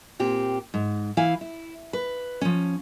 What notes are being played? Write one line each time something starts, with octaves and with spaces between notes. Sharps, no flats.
A#2 C4 G4
G#2
E3 E4 F5 G#5
E4
B4
F3 C#4